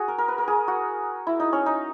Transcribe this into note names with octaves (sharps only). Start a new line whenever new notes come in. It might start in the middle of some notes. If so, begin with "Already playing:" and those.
Already playing: F#4 G#4
A#4
A#4
B4
A#4
G#4
F#4
E4
D#4
C#4
D#4